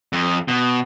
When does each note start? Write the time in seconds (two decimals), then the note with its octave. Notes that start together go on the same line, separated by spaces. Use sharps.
0.13 F2
0.48 B2